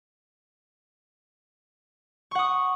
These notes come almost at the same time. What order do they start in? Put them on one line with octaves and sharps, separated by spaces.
C#6 F#5 D#6